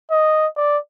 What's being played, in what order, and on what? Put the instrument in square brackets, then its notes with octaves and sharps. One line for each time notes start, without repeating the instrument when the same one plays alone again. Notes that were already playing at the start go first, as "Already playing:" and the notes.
[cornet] D#5
D5